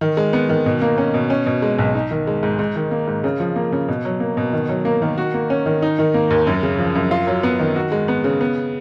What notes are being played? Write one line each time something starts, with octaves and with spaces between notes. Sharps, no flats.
D#3
G#3
B3
D#3
B2
A#3
C#4
B2
C#4
B2
G#3
B1
D#4
D#3
G#3
G#2
G#2
D#3
A#3
G#2
C#3
F3
A#3
C#3
B2
F#3
A#3
B2
D#3
F#3
A#3
D#3
F#4
A#3
C#4
D#3
D#4
D#3
A#3
D#2
F#2
C#3
F3
F#2
F4
F#3
B3
D#3
F#4
G#3
B3
C#3
B3